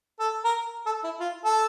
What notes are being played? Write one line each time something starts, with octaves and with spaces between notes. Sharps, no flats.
A4
A#4
A4
E4
F4
A4